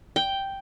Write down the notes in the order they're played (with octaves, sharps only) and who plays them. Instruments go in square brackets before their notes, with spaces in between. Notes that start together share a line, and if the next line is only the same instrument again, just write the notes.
[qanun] G5